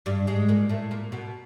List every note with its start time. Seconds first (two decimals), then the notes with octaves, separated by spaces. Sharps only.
0.06 G2 G3
0.27 G#2 G#3
0.49 A#2 A#3
0.69 A2 A3
0.91 A#2 A#3
1.12 B2 B3